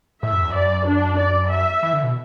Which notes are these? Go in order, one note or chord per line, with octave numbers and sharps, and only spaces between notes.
A2 E5
F#2
E2
F#2 D5
D4
D5
E5
E3
D3
B2